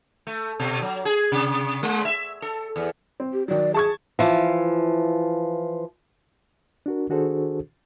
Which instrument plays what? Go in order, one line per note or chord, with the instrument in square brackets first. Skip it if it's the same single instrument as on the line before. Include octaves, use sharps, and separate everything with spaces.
[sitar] A3
B2
F#3
G#4
C3
G#3
E5
A4
E2
[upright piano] C4
[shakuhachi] G4
[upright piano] D#3 F#3 [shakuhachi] D5
[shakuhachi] G#4 [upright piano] A5 C#6 G#6
[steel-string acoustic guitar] E3 F3
[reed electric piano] D4 F#4 A#4
D#3 D4 F#4 G#4 A4 C5